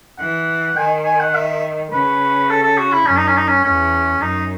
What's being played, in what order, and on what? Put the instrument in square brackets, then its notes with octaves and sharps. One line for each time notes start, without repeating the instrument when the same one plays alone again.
[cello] E3 [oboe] F#5
[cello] D#3 [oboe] G#5
[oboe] G#5
F#5
E5
[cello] C#3 [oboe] B4
[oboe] A4
A4
F#4
E4
[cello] F#2 [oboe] C#4
[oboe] D#4
C#4
D#4
C#4
[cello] E2 [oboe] C#4
[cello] F#2 [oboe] D#4